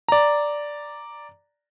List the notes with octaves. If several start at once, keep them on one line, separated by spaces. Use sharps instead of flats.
D5 A#5